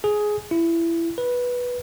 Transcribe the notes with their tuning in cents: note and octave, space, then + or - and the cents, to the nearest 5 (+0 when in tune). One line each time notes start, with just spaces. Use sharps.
G#4 +10
E4 +20
B4 -10